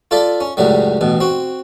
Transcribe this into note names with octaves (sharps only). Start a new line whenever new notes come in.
F4 A4 D5 E5 F5
C#4
C#2 F#2 A2 F#3 G3
A1 B2
C4 F#4